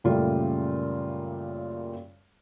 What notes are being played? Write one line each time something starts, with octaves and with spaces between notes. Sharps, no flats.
F#2 A#2 C#3 G3 A3 F4